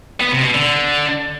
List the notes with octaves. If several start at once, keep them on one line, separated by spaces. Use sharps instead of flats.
B3
C3
B2
D3